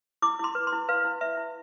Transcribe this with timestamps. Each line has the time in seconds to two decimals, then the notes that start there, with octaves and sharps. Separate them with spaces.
0.22 E4 D6
0.39 E4 C6
0.55 B4
0.67 C6
0.72 E4
0.88 B4 F5
1.04 E4
1.21 B4 E5
1.37 E4